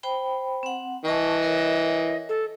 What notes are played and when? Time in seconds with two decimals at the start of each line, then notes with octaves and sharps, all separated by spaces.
0.03 C5 G5 B5
0.63 C4 F#5
1.05 E3 D#5 A5 C#6
1.43 A#4 C#5 E5
2.29 A4